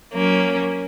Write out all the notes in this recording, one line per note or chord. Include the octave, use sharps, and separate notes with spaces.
F#3 A#3 C#4